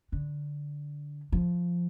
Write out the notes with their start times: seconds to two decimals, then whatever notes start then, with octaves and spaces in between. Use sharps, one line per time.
0.12 D3
1.32 F3